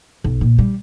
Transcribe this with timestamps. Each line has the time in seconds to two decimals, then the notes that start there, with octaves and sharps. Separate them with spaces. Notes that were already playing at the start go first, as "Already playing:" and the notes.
0.24 B1
0.41 A#2
0.59 G3